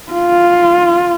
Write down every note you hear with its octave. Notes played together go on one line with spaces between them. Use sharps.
F4